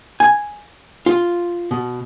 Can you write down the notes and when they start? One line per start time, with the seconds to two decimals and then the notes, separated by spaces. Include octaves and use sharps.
0.20 G#5
1.06 F4
1.71 B2